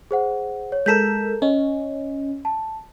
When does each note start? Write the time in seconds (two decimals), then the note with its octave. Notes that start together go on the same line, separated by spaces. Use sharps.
0.11 G#4 C5 F#5
0.72 C#5
0.86 G#3 A4 A#4 G6 B6 E7
1.42 C#4 D#5
2.45 A5